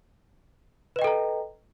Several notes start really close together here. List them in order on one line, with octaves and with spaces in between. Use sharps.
B4 D#5 G5 A4 A#5